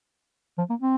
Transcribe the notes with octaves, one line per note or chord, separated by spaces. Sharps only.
F3
A#3
C4